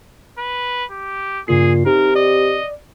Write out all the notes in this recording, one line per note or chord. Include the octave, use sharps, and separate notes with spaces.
B4
G4
G2 A#2 C#3 G#4 C7
C3 D#4 A#4
D5 D#5